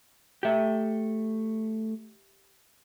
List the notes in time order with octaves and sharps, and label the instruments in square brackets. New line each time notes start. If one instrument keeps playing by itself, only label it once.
[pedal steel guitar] A3 G5 [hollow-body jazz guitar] G4 E5